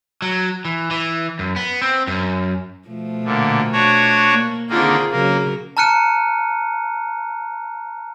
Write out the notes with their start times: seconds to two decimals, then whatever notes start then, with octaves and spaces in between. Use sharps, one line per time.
0.22 F#3
0.65 E3
0.91 E3
1.39 F#2
1.56 B3
1.82 C4
2.07 F#2
2.88 B2 F3 A3
3.25 A#2 D3
3.72 D4 F#4 C#5
4.32 A#3
4.69 D3 D#3 A#3 C4 F4 G#4
5.11 C#3 F#3 A#3 A#4
5.77 A5 A#5 F6 F#6 C#7 D#7